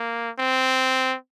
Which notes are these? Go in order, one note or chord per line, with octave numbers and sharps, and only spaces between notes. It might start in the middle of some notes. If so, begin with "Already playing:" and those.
Already playing: A#3
C4